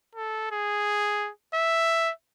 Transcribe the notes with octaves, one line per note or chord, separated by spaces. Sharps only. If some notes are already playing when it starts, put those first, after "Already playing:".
A4
G#4
E5